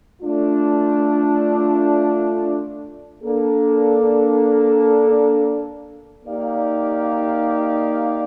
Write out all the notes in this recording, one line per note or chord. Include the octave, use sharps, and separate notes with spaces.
A3 D4 F4
A#3 D4 A4
A#3 D#4 G4 D5 F5